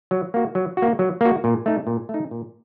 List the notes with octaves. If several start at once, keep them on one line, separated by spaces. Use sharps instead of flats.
F#3
A#3 F#4
F#3
F#4
A#3
F#3
A#3 F#4
A#2
A3 D#4
A#2
A3
D#4
A#2